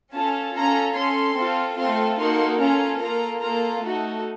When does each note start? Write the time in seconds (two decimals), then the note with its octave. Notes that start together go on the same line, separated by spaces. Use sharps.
0.13 C#4 F4 A4 A5
0.55 C#4 F4 A4 A#5
0.95 C#4 A4 C6
1.37 C4 F4 A4
1.78 A3 C4 F4 A4 C6
2.19 A#3 D#4 F#4 A4 C6
2.60 C#4 F4 A4 A#5
3.01 A#3 F4 A4 A#5
3.42 A#3 F4 A4 A#5
3.83 A3 D#4 F#4 A4